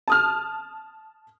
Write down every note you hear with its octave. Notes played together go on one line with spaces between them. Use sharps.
A5 D#6 F6